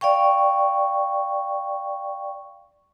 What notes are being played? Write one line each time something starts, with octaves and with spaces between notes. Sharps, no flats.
D5 F5 G5 C#6